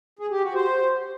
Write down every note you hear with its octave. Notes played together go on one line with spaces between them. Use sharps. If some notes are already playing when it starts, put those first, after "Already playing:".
G#4
G4
F#4
C5